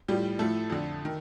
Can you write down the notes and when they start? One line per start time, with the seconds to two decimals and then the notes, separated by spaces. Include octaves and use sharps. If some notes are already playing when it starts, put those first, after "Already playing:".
0.08 A2 F3 G3 G4
0.39 A2 F3 A3 A4
0.70 F2 D3 F3
1.05 D#3